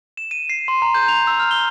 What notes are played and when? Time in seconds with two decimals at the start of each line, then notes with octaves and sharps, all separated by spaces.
0.17 E7
0.31 D#7
0.49 C7
0.68 C6
0.82 A#5
0.95 G6
1.08 F7
1.27 E6
1.40 F6
1.51 G7